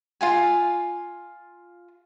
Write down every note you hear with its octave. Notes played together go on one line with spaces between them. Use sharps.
F4 F5 G#5